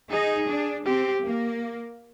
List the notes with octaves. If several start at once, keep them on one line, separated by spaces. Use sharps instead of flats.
D#4 G#4
D4
C4 G4
A#3